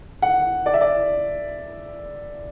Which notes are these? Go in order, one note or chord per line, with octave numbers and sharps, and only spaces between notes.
F#5
D5
E5
D5